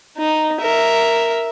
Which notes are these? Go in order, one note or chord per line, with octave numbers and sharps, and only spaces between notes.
D#4
A#4 E5